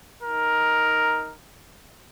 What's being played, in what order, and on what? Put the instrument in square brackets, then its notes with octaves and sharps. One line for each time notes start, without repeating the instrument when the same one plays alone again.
[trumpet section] D#4 A#4